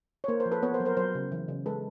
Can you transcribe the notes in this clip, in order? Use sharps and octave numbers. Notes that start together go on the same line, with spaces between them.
C#5
A#3 A#4 C5
A#4 C5
F3
A4 B4
B3 B4 C#5
A#4 C5
F#3
A#4 C5
F#3 A#4 C5
C#3
E3
C#3
G#3 A4 B4